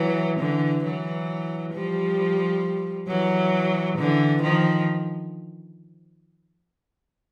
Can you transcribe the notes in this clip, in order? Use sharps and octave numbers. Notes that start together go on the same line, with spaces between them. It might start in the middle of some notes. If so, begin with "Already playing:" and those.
Already playing: E3 F#3
D3 E3
E3 F#3
F3 G3
E3 F#3
D3 E3
D#3 F3